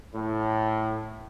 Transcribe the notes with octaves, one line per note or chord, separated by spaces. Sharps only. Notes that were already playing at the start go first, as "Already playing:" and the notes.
A2